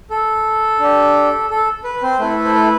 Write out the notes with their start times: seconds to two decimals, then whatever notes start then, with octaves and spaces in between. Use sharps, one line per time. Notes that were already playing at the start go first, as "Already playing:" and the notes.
0.10 A4
0.80 D4 G4
1.50 A4
1.84 B4
2.02 C4 C5
2.19 A3 E4 A4 B4
2.45 C5
2.55 B4